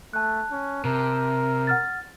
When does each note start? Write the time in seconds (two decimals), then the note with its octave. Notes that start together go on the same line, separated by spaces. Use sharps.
0.13 A3 A5 F#6
0.52 C#4
0.85 C3 A#4
1.67 F#5 F6 A6